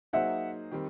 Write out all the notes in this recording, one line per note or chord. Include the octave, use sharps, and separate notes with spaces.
F#3 A#3 D#4 G#4 C5 E5 F#5
D#3 G3 C4